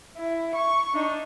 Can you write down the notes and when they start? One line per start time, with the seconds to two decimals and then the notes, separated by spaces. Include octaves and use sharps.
0.17 E4
0.55 C#6
0.94 D4 D#4